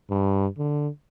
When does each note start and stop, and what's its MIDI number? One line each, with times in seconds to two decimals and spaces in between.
0.10 0.47 43
0.58 0.89 50